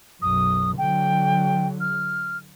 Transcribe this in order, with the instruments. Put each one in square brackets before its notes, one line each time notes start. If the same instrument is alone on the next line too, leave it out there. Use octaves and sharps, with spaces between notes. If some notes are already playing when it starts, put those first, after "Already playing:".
[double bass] B1 F#2 [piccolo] D#6
[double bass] D3 F#3 [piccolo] G5
[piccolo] F6